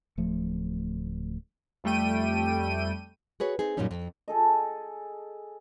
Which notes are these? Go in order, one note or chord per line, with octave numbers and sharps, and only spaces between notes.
D1 F3 A3
F2 G3 A3 G5 D#7
F#4 G#4 B4 C#5
C4 D#4 G#4
F#2 A#2 F#3 G3 C#4 D#4
F2
G#4 A4 D#5